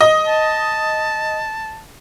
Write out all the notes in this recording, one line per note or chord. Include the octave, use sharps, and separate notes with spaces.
D#5
A5